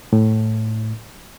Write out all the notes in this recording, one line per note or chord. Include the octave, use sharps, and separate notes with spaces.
A2